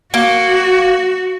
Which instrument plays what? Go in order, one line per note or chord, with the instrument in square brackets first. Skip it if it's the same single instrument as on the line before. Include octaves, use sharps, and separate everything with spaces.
[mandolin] A#3 [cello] F#4